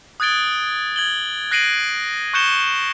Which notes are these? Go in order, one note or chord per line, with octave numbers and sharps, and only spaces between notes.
D#6 F#6 G#6 A6 D7 G7
G#6 F#7 G7
F#6 A#6 C7 D7 D#7 F#7
C#6 F#6 G6 C#7 E7 G7